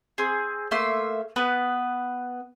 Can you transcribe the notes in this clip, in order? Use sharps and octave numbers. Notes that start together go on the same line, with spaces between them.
C4 G#4
A3 A#3 E5 C6
B3 B4